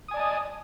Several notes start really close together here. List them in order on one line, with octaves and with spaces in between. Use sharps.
D#6 G#5 D5 A5 D#5